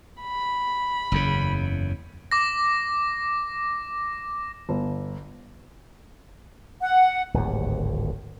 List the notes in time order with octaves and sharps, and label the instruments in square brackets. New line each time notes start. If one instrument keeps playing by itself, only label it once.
[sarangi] B5
[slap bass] F#1 E2 C#3
[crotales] D6 A#6
[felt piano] G1
[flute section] F#5
[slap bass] D1 G#1 D#2